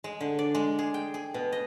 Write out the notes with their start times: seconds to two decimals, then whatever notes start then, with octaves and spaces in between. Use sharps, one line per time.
0.04 G#3
0.21 D3
0.39 D5
0.55 G#3
0.79 G#4
0.94 G5
1.14 G#4
1.34 B2
1.52 D#5